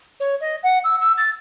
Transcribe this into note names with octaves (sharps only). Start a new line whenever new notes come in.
C#5
D#5
F#5
E6
E6
A6